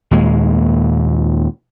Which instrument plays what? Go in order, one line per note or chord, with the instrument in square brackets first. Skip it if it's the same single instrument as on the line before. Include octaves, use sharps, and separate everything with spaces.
[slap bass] D#2 A#2 G#3